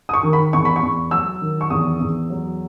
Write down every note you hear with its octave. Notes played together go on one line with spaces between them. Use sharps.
D#6
C#6
D#3
B5
E2 C#6
B5
C#6
E2
F#3 E6
D#3
C#6
E2 D#6
E2
F#3